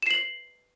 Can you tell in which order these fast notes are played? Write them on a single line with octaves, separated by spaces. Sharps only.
E7 C7 F#7